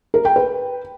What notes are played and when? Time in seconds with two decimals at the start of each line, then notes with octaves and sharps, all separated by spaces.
0.14 A#4
0.25 G5
0.36 B4